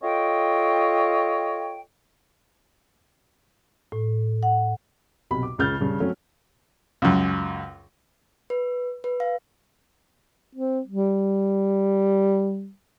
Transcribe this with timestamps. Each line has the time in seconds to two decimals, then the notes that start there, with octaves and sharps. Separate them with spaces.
0.02 F4 A4 C#5 D#5 G5
3.92 A2
4.43 F#5
5.31 B1 C3 B5
5.43 D6
5.58 C#2 C#3 F6 G6 A6
5.81 G2 C#3
6.00 F#3 A3 C4 C#4
7.02 C#2 F#2
8.50 B4
9.04 B4
9.20 F5
10.55 C4
10.87 G3